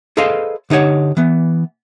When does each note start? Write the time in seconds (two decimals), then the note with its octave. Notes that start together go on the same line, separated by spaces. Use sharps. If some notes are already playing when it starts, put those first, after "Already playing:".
0.17 G#4 A4 B4 C5 D#5 F5
0.70 D3 D#4 G4 C#5 F#5
1.17 E3 B3